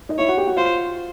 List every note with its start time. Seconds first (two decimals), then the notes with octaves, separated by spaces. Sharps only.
0.09 D#4 D#5
0.18 E4 C#5 E5
0.28 F#4 F#5
0.38 G4 G5
0.47 F#4 F#5
0.56 F4 C5 F5